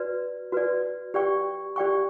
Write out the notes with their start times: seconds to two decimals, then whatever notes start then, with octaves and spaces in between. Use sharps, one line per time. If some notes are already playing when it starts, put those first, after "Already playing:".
Already playing: F#4 B4 D5
0.52 F#4 B4 D5
1.14 G4 D5 G5 C#6
1.76 G4 D5 G5 C#6